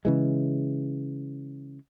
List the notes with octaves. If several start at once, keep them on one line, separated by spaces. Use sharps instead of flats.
C#3 E3 G#3